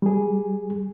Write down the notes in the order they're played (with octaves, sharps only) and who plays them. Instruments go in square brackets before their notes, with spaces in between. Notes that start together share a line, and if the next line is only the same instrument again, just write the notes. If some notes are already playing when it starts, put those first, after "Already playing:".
[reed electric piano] G3 G#4